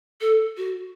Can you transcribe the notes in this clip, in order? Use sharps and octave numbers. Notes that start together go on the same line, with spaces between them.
A4
F#4